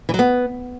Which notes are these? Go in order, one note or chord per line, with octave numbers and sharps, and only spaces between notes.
E3
F#3
B3